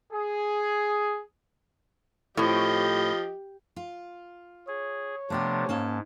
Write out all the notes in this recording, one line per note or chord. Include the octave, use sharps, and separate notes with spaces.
G#4
A2 F3 C4 G4 D#5
F4
G#4 C#5
C3 F3 A3 B3 D4 G4
G#2 A#3 C#4 A5